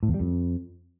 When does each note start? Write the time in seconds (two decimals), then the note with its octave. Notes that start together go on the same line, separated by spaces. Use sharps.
0.03 A2
0.08 E2
0.14 G3
0.20 F2